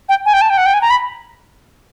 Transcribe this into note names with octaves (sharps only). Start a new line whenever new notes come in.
G5
G#5
G5
A5
G5
F#5
G5
G#5
A#5
B5